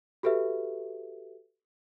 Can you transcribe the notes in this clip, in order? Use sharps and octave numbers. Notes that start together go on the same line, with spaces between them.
F#4 G4 A4 B4 E5